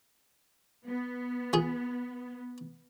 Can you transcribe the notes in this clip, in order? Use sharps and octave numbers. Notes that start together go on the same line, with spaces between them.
B3
F4 G#4